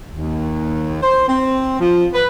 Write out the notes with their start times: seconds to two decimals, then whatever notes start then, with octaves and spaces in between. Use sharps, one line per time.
0.12 D#2
1.02 C5
1.28 C4
1.80 F3
2.14 B4